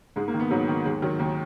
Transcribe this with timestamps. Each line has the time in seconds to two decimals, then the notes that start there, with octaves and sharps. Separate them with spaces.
0.16 G#2 G#3
0.28 A#3
0.34 D#3
0.40 B3
0.51 G#2 F#3
0.68 D#3
0.85 D#2 G#3
1.02 D#3 F#3
1.19 D#2